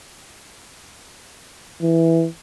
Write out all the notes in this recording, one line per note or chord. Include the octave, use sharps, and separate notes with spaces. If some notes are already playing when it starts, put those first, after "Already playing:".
E3